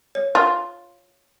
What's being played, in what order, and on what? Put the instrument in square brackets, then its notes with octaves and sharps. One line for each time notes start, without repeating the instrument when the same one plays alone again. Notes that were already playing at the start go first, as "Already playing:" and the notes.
[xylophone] C#5
[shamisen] F4